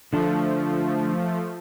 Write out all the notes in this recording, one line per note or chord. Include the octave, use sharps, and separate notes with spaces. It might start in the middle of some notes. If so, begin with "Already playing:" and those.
D3 F3 A3 D4 A4